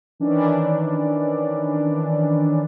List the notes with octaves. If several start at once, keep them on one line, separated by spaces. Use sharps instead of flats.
D#3 E3 C#4 D4